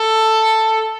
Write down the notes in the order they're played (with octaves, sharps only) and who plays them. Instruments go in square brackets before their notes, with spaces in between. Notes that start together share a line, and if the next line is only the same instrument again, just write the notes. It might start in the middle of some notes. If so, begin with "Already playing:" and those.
Already playing: [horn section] A4